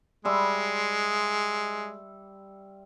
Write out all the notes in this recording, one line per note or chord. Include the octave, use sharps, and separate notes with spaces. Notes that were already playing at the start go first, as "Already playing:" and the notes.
G3 G#3 E5 C6